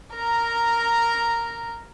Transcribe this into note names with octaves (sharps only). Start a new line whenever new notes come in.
A#4 A#5